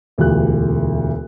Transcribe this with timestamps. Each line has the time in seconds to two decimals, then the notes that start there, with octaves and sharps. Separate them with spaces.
0.18 E1 D2 E3 F4 G4 F#6